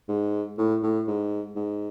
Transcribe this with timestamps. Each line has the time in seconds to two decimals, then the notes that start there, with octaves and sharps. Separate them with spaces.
0.09 G#2
0.58 A2
0.83 A2
1.07 G#2
1.56 G#2